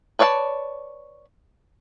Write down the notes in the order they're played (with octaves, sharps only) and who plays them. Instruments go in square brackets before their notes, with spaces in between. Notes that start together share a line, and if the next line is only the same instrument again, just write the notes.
[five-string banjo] B4 C#5 D5 F5 A5